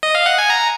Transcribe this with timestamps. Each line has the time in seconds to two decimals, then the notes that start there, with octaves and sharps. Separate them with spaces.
0.03 D#5
0.15 F5
0.26 F#5
0.38 G#5
0.50 A#5